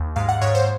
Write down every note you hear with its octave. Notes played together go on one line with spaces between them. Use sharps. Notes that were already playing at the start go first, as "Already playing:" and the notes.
Already playing: D#2
G#2 F5
F#5
G#2 C#5
C5